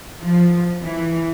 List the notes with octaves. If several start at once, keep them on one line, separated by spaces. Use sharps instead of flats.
F3
E3